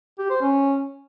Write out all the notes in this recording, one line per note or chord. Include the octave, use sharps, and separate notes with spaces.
G4
C5
C#4